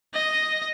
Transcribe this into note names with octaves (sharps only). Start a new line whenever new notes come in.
D#5